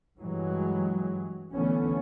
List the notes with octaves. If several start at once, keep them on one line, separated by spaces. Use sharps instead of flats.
G2 E3 F#3 G#3
D3 E3 A3 B3 C#4